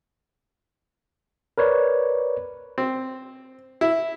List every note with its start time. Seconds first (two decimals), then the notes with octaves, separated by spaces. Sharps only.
1.58 A#4 B4 C#5 D5
2.78 C4
3.81 E4